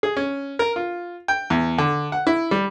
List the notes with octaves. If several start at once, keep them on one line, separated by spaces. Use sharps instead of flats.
G#4
C#4
A#4
F4
G5
E2
D3
F#5
E4
G3